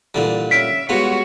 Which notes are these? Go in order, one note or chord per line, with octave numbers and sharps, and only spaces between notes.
A#2 D3 E3 G3 A4
C#4 E5 F6 B6 D7
G3 G#3 B3 F4 F#4 C#5